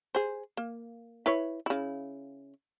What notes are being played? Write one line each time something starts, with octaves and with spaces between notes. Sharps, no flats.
G#4 C5
A#3
E4 B4 C#5
C#3 E4